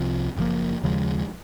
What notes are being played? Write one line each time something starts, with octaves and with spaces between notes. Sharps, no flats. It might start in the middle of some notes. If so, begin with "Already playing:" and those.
Already playing: C2 C3 F3
F#1 F#2 F3 A#3
D#2 C#3 F3 G#3